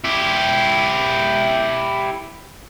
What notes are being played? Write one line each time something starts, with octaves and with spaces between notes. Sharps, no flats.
E4 G4